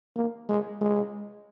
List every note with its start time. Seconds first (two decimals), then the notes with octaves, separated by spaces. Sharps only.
0.17 A#3
0.49 G#3
0.81 G#3